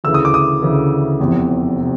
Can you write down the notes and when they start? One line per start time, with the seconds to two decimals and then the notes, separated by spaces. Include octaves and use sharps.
0.04 D2 C#3 E3 E6
0.14 D#6
0.25 D6
0.34 D#6
0.62 D2 C#3 E3
1.20 F1 E2 C3
1.81 C3